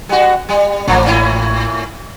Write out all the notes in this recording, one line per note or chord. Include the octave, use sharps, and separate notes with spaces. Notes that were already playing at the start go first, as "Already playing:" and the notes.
G3 F#4
G3
A1 C3 F3 A#3
A2 C#4 E4